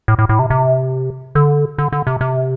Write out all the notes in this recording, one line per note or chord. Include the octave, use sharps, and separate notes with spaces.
A2
A2
A2
C3
C3
D3
D3
D3
C3
C3